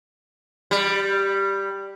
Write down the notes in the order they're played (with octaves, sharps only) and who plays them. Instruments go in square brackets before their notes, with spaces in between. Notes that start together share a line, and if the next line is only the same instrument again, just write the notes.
[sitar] G3